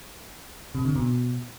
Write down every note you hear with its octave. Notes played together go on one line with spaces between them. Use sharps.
C3
D3
B2